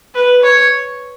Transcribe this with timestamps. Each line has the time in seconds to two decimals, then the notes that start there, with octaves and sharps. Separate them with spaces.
0.14 B4
0.43 C#5